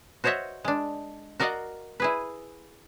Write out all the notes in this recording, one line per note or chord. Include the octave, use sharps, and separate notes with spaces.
F#4 C5 C#5 D#5 E5 F#5
G#3 D4
F#4 A#4 D5 D#5 F5 F#5
E4 G#4 B4